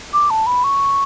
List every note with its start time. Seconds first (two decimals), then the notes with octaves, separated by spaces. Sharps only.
0.13 D6
0.30 A5
0.47 B5
0.64 C#6